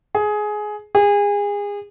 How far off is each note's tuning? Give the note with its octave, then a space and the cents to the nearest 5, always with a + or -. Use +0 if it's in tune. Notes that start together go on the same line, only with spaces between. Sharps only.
G#4 +15
G#4 -30